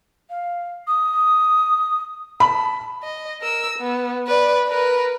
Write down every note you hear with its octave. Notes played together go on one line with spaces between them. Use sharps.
F5
D#6
A5 B5
D#5
A#4 E6
B3
B4 D5
A#4 B4